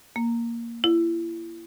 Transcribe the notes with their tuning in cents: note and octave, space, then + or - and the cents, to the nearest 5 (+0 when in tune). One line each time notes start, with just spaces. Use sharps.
A#3 +0
E4 +30